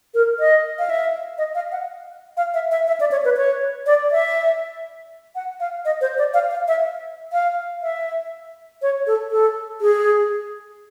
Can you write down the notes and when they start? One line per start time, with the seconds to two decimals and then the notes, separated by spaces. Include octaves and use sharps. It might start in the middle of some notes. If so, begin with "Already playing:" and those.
0.14 A#4
0.40 D#5
0.79 F5
0.90 E5
1.38 D#5
1.55 F5
1.72 F#5
2.37 F5
2.54 E5
2.71 E5
2.87 E5
3.00 D5
3.11 C#5
3.25 B4
3.37 C#5
3.86 D5
4.12 E5
5.35 F#5
5.60 F5
5.85 D#5
6.01 C5
6.18 D5
6.34 F5
6.50 F5
6.68 E5
7.33 F5
7.82 E5
8.82 C#5
9.07 A4
9.31 A4
9.81 G#4